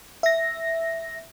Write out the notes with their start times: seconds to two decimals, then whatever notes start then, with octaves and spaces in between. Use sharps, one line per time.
0.23 E5 A#6